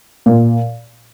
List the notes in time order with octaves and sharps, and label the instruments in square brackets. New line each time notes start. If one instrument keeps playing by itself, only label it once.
[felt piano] A#2